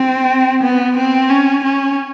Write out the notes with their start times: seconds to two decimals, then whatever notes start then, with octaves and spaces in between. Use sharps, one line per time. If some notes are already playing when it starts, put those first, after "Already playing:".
Already playing: C4
0.63 B3
0.97 C4
1.30 C#4
1.64 C#4